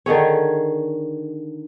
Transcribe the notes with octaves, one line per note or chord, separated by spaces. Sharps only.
D3 D#3 G#4 C#5